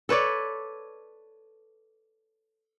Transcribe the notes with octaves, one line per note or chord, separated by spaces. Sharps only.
A4 B4 C#5 D5